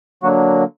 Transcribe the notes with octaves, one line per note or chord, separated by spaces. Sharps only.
D3 F#3 A#3 F#4